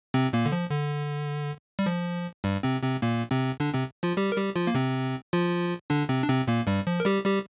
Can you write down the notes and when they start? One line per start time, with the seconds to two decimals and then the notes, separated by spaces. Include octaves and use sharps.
0.14 C3 C4
0.33 A#2 A#3
0.46 D3
0.52 F3
0.71 D3
1.79 G3
1.86 F3
2.44 G2 G3
2.63 C3 C4
2.83 C3 C4
3.02 A#2 A#3
3.31 C3 C4
3.60 D3 D4
3.74 C3 C4
4.03 F3 F4
4.17 G3 G4
4.32 A#4
4.36 G3 G4
4.56 F3 F4
4.67 A#3
4.75 C3 C4
5.33 F3 F4
5.90 D3 D4
6.09 C3 C4
6.23 D4
6.29 C3 C4
6.47 A#2 A#3
6.67 G2 G3
6.87 F3
7.00 A#4
7.05 G3 G4
7.25 G3 G4